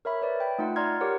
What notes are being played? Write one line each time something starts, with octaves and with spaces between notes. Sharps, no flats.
A#4 C#5 E5 B5
B4 C#5 D5
G5 B5
A3 D#4 F4 F#5
D5 A#5 C6 F6 G#6
G4 A#4 C#5 F#5